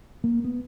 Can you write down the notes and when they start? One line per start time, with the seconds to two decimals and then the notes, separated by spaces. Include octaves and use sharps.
0.24 A#3
0.45 B3